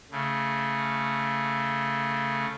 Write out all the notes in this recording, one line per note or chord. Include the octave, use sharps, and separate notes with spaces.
C#3 A3